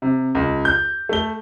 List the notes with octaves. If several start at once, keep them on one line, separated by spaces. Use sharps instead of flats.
C3
C#2
G6
A3 G7